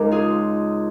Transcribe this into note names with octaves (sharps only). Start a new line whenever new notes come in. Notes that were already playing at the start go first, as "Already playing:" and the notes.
Already playing: C#2 C#3 G#3 D#4 A#4
F4 G#4